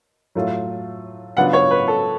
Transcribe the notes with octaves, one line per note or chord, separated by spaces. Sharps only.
A2 F#3 A3 F4
C#3 F#3 B3 D4 F4 F#5
C#5
B4
A4